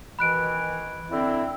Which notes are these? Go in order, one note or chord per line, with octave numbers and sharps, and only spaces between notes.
B2 D#3 E3 B5 F#6 D7
D3 C4 E4